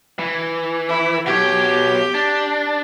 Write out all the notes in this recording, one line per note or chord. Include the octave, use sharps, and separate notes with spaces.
E3
E4
B2 G4 C#5
D4